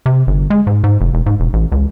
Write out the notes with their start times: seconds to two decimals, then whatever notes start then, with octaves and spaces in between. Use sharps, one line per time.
0.06 C3
0.27 G1
0.50 G#3
0.67 G#2
0.84 G#2
1.01 F1
1.14 E1
1.26 G#2
1.40 E1
1.53 A1
1.72 C#2